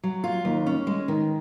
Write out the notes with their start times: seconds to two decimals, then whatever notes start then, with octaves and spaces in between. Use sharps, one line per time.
0.03 F#3
0.24 F4
0.45 D#2
0.66 C#4
0.87 G#3
1.08 D#3